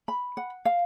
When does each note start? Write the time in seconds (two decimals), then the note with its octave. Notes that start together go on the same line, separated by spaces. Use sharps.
0.08 B5
0.37 F#5
0.65 F5